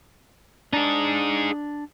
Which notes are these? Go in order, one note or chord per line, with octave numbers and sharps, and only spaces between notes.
D4 D#4 G#4